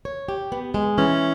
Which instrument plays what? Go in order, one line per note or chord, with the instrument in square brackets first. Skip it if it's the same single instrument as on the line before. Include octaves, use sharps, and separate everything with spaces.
[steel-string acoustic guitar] C#5
G4
B3
G#3
[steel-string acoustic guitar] E3 [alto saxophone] C#4